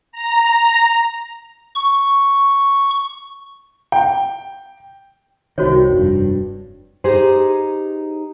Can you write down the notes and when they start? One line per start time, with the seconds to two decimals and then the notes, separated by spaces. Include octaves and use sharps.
0.12 A#5
1.76 C#6
3.92 G5
5.58 C2 D#3 F#4 C5 C#5
5.88 F1 G2
7.04 D#4 G4 G#4 C5